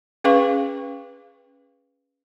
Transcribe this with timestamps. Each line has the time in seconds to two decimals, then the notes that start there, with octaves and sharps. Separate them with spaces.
0.24 C#4 G#4 B4 F5 C#6